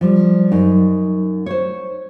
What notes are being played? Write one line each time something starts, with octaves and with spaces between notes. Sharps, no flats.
F3 G3
F#2 D#4
C5 C#5